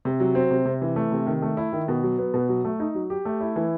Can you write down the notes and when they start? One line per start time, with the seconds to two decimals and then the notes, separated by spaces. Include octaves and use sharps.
0.05 C3
0.20 F#3
0.35 C4
0.51 C3
0.65 C3
0.82 E3
0.96 A3
1.11 C3
1.26 D#3
1.42 A3
1.57 E4
1.73 D#3
1.88 B2
2.03 F#3
2.19 B3
2.34 B2
2.49 F#3
2.65 A3
2.80 D#4
2.95 F#3
3.10 G4
3.25 A3
3.41 E4
3.56 E3